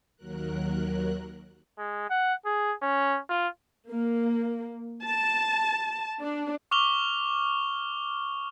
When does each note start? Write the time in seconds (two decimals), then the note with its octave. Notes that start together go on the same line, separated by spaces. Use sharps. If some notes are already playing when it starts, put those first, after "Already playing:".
0.16 D#2 F#3 A#4 F#6
1.78 G#3
2.10 F#5
2.46 G#4
2.82 C#4
3.29 F4
3.89 A#3
5.05 A5
6.19 D4
6.71 C#6 D6 F6 F7 G7